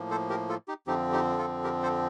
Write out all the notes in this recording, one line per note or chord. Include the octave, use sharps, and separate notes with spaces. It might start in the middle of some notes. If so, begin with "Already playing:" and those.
Already playing: A2 F3 A#3
A4 C5
G4 A#4
F4 A4
D#4 G4
F2 D3 F3 C4 D#4 G4
D#4 G4
F4 A4
G4 A#4
A4 C5